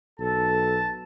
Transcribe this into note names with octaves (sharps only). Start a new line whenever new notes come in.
B1 A4 A5